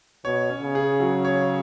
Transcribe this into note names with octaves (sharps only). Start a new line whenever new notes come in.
B2 C#5
C#4
C#3
G#4
F#3
C#5